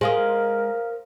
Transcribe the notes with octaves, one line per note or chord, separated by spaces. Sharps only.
G#3 A#4 C5 F5 D#6